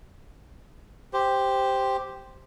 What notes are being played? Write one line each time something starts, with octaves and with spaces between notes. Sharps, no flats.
G4 C5